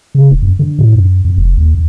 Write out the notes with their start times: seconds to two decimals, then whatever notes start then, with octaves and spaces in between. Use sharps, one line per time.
0.15 C#3
0.31 D#1
0.42 F#2
0.59 D3
0.79 A2
0.95 F#2
1.25 F2
1.38 F1
1.57 D#2
1.74 E2